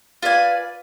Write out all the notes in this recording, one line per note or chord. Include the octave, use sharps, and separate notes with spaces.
F4 B4 D5 G#5